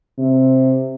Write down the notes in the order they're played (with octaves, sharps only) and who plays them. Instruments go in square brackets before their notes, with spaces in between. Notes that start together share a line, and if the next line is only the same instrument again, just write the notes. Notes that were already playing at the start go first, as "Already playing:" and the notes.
[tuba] C3